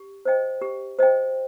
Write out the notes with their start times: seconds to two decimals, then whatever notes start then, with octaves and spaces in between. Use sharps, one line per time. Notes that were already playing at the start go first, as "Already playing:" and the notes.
Already playing: G4
0.25 C5 D#5 G5
0.62 G4
0.99 C5 D#5 G5